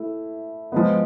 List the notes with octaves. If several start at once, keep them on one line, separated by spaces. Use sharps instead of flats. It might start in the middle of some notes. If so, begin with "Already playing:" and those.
Already playing: A3 E4
F3 G#3 B3